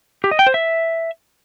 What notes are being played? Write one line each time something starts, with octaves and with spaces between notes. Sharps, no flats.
G4
D#5
G5
C5
E5